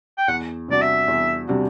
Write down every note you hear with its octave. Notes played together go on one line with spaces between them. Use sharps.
G5
E2 F#5
C3 G3 D4 F#4 D5
E5
E2
C3 G3 D4 F#4